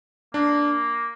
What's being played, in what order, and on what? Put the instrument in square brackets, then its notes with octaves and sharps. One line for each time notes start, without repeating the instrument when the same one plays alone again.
[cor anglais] A#3 [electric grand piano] D4